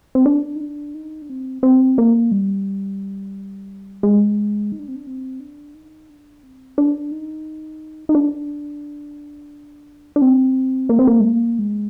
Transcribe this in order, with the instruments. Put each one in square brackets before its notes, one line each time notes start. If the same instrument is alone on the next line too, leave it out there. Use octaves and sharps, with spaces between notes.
[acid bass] C4
D4
D#4
D4
D#4
D4
C4
C4
A#3
G3
G#3
D#4
D4
C4
D4
C4
D4
D#4
D4
C4
D4
D#4
D#4
D4
D4
C4
A#3
C4
A#3
G#3
A#3
G#3